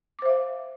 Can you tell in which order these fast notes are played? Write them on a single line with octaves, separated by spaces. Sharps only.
D6 C5 E5 F5